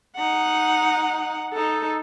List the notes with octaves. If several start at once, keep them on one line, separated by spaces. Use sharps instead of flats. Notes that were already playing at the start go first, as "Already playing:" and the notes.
D#4 F#5
D#4 A4